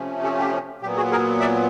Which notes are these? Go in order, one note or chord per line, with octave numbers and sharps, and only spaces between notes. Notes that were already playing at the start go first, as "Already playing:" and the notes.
Already playing: C3 F3 A3 C#4
G4 A4
G4
A#2 F#3 B3 G4
F#4 G#4
G#4 A#4
D5 E5